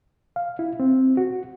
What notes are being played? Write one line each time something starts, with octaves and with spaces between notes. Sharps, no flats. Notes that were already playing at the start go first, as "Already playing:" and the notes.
F5
E4
C4
F#4